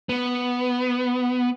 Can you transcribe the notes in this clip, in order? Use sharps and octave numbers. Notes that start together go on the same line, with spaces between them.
B3